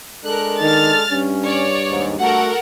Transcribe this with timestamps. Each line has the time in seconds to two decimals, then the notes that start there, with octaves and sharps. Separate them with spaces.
0.25 G#3 D4 A4 A#4 F#6
0.62 D#3 F6 A6
1.11 G2 C#4
1.45 C#5 D5
1.89 D#2 G#2
2.20 A3 F#4 A4 A#4 F#5